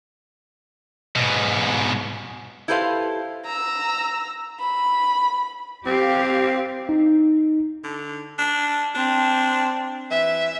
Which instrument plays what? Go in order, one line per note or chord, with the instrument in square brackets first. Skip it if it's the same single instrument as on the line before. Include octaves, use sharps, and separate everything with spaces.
[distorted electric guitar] G#2 B2
[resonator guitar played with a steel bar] E4 G4 A4 B4 C5 F5
[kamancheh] A#5 E6
B5
[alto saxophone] C4 [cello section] G4 F5
[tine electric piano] D#4
[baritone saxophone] D3
D4
[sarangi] C4 [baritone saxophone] D4
[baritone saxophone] E3 [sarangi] E5